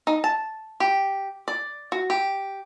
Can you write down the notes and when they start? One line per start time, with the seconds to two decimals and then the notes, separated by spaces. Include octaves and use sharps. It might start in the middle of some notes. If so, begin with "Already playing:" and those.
0.07 D#4
0.24 A5
0.80 G4
1.48 D5
1.92 F#4
2.10 G4